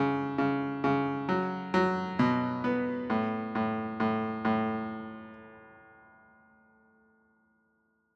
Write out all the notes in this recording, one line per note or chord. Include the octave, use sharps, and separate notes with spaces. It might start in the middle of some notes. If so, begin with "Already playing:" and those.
Already playing: C#3
C#3
C#3
F#3
F#3
B2
B3
A2
A2
A2
A2